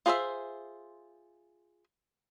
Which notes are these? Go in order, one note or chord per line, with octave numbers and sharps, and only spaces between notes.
F4 G#4 C5 D5 E5